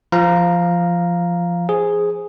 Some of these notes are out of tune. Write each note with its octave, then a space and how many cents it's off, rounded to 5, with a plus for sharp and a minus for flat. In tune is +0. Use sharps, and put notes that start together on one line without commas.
F3 -15 F5 +0 A#5 +0
G#4 +0 C5 +0